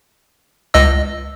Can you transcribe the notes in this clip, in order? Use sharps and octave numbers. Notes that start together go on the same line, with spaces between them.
C#2 D#5 E6